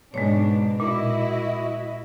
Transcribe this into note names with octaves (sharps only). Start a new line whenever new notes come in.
G#2 B2 G#3 D4 C#5
A#2 E4 F#4 D#5